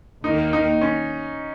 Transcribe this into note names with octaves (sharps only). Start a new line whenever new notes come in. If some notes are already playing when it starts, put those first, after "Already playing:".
D#2 D#3 A#3 D#4
D#4
C#4